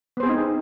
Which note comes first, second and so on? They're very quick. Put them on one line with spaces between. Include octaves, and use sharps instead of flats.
B3 C5 G#4 C4 D#4